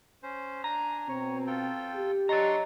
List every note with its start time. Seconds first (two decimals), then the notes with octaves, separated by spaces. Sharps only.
0.23 C#4 C5
0.64 D4 G#5 A#5
1.08 B2 C4 C#5
1.47 F4 A4 G5
1.94 G4
2.29 D4 C#5 D#5 A#5 C6 C#6 A6